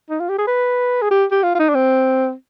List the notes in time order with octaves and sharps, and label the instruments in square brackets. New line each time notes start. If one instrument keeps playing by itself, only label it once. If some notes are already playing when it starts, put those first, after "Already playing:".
[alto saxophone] D#4
F4
G4
G#4
B4
G#4
G4
G4
F4
F4
D#4
D4
C4